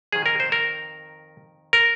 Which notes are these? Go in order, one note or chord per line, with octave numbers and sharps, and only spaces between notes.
F2 D#3 G#4
A#4
C5
A#4
A#4